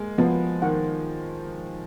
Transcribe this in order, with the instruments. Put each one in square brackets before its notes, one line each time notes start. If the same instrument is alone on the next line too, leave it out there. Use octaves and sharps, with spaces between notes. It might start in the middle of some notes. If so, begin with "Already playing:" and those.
Already playing: [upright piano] G#3 A#3
[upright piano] F3 [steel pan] B3
[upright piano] D#3 [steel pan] F#5